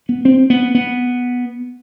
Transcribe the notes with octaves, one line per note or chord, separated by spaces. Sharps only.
B3
C4
B3
B3